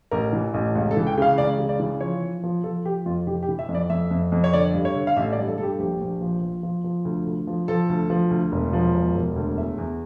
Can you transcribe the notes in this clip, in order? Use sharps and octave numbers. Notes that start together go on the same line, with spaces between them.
A1 A#4
E3
A1
C#2
A4
E3
G5
C#3 F5
C#2 D5
C#3
D5
E3
F3 C#5
F3
F3
F3 A4
F3 G4
F2 F4
E3 G4
G4
E3
E5
F2
D5
F2 E5
F2
F2
C#5
D3 D5
G2
C#5
D3
F5
A1 E5
D5
G2
A4
G2 A4
G4
A#1 G4
A#1
F3
F3
F3
F3
D2
D2
F3
F3 A4
D2
F3
D2
E1
F3
E1
E1
D2
E2 E5
E2